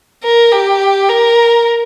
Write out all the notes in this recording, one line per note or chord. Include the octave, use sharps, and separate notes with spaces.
A#4
G4
A#4